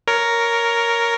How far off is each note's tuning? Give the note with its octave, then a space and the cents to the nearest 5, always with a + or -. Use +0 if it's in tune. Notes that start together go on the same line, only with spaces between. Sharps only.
A#4 +0 C#5 +15